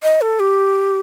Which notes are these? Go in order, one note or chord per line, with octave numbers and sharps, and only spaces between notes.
D#5
A4
G4